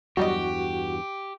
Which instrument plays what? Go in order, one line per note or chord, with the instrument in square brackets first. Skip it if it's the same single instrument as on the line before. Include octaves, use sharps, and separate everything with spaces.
[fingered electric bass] E2 G2 [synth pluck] F#3 G3 D#5 [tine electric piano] F#4 [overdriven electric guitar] G4